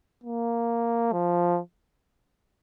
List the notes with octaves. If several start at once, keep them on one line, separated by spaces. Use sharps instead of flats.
A#3
F3